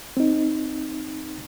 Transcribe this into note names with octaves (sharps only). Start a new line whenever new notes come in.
C4 D#4